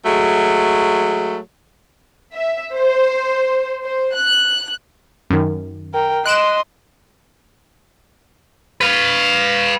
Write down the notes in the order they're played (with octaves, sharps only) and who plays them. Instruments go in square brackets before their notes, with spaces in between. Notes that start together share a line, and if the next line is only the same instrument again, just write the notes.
[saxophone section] F#3 G#3 A3
[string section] E5
C5
C5
F#6
[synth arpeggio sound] F#2 D#3
[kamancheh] A#4 G5
[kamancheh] D#5 C6 [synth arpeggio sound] F#6 D7 E7
[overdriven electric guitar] B4 F5